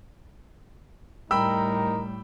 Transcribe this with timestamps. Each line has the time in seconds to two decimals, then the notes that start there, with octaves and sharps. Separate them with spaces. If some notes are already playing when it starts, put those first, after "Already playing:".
1.31 A2 G3 D#4 A#4 G5 B5 E6